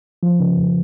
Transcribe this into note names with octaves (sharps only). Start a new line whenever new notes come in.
F3
C#3
F2